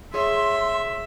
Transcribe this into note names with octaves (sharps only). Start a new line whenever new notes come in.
G#4 C#5 E5 C6